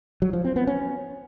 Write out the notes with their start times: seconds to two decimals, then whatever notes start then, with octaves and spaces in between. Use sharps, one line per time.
0.22 F#3
0.33 F3
0.45 C4
0.56 B3
0.67 C#4